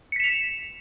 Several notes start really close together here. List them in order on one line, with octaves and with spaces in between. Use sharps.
C#7 B6 E7 F7